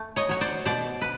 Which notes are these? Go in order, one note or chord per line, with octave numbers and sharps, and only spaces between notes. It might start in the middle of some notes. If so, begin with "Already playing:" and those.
Already playing: A3
C#5 D#5
F#3 C#5
C5 D5
B2 C5 D5
B4